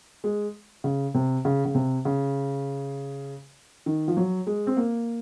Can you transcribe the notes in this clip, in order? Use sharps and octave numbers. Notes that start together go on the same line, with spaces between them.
G#3
C#3
C3
C#3
C#3
C3
C#3
D#3
F3
F#3
G#3
C4
A#3